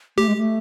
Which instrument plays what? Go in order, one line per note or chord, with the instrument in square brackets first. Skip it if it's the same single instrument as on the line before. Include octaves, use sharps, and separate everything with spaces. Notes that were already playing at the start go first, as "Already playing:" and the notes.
[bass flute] A3 [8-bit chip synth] G4
[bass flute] G#3
A3